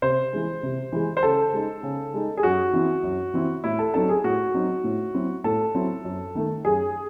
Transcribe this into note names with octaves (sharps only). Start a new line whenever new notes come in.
C3 C5
E3 G#3
C3
E3 G#3
C5
C#3 A4
G#3 D#4
C#3
G#3 D#4
G#4
F#2 F#4
E3 C4 E4
F#2
E3 C4 E4
A2 E4
A4
F#3 C4 D#4 A4
G#4
A2 F#4
F#3 C4 D#4
A2
F#3 C4 E4
A2 A4
F#3 C4 E4
F#2
D#3 A3
F#2 G#4